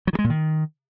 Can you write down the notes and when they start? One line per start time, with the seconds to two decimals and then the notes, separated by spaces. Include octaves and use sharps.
0.07 F#3
0.13 D#3
0.19 G#3
0.24 A#2
0.30 D#3